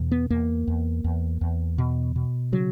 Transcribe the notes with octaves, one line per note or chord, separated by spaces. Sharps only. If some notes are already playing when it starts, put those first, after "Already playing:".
Already playing: E2 B2
B3
E2 A#3
E2
E2
E2
B2
B2
C#3 F#3